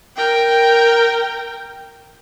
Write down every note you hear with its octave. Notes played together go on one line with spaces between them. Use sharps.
A#4 G5